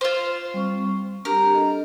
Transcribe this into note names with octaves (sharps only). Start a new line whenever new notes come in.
F4 C5
G3 C4 C#6
D4 G4 A#4
A4 D#5